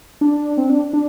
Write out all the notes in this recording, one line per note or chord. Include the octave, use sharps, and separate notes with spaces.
D4
C4
D4
D4